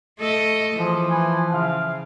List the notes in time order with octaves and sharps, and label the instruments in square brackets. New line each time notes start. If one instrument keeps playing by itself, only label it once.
[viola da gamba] A3 A4 D#5
[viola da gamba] E3 [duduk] F3 [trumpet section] F4 G#4
[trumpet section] E4 B4 G#5
[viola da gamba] C#3 [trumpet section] E5 F5